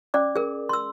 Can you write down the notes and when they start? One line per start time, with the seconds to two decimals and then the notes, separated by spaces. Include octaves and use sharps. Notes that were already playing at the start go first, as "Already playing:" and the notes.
0.14 C#4 D5 D6
0.36 G#4 A#4
0.69 C6 E6